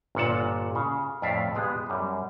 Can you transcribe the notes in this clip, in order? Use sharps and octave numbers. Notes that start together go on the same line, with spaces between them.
G1 A#2 F#5 A5
C#3
F2 A2 D5 E5 F5
G#3 B3 G4 G#4
F#2 G3